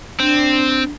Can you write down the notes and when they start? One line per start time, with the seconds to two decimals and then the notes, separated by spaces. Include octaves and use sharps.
0.20 C4 D4